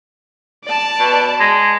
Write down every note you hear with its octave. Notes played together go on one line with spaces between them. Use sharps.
D5 A5
B2
G#3